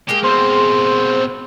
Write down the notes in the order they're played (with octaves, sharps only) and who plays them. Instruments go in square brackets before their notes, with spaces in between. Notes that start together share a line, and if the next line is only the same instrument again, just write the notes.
[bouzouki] G#3 A#3 G#4 [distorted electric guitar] G4
[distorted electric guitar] B2 C4 [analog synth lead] C5